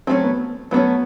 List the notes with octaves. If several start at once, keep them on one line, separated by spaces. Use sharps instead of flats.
F#3 A3 C4 C#4
B3
F#3 A3 B3 C#4